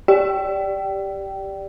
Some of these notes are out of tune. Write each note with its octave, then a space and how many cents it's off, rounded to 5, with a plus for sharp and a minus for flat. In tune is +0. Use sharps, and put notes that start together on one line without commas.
G4 +0 D5 +0 G5 -20